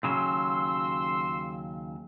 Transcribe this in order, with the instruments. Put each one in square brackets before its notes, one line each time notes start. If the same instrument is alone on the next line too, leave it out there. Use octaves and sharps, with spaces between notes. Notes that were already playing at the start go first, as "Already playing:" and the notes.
[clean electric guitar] D#2 C#3 F#3 [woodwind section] C6 E6